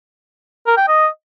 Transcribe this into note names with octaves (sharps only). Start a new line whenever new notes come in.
A#4
G5
D#5